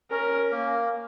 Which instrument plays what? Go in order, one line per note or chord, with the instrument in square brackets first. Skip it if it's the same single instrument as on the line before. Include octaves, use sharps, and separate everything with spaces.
[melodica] C#4 [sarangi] A#4
[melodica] A#3